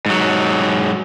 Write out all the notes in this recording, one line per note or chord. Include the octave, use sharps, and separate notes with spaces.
G#2 F#3